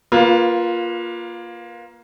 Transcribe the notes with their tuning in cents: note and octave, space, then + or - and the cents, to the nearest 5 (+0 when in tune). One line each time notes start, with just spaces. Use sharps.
A#3 +15 F4 +0 B4 +0